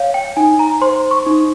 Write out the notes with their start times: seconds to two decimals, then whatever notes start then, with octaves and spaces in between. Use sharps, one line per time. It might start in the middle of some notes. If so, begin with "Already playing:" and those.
Already playing: C#5 F5
0.14 G5
0.37 D#4 G#5
0.59 A#5
0.81 C5 C6
1.11 C#6
1.26 D#4